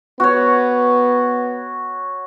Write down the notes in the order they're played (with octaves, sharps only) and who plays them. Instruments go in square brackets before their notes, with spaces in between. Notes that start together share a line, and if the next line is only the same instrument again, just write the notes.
[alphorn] B3 [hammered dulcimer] F#4 C#5